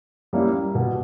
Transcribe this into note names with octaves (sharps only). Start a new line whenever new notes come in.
G3 A#3 C#4 E4
B2